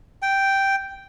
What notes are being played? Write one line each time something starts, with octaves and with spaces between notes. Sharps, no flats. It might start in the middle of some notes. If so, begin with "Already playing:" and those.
G5